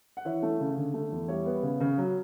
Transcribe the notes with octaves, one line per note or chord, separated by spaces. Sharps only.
F#5
E3 C#5 E5
A3
C#3
D3
A3
E2
G3 C#5 E5
B3
C#3
C#3
F#3